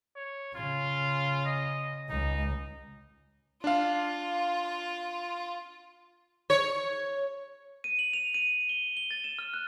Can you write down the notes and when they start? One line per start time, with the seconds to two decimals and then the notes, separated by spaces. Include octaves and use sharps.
0.16 C#5
0.55 C#3 F4
1.45 D#5
2.09 C#2 D#4
3.64 D4 F4 F5
6.50 C#5
7.84 D#7
7.99 F#7
8.13 F7
8.34 D#7
8.69 G7
8.97 G7
9.11 A6
9.24 E7
9.39 F6
9.54 F#6